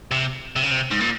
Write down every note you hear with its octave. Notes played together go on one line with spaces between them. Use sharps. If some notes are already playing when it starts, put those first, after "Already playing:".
C3
C3
C#3
C3
G#2
A#2